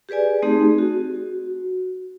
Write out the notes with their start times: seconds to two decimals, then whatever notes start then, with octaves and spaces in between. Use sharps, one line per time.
0.09 G4 G#4 B4 D5 G#5
0.42 A3 C4 D#4 G4 G#4
0.78 F#4